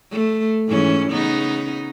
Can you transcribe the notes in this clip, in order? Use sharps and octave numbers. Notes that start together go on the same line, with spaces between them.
A3
G#2 E3 C#4
C#3 B3 D#4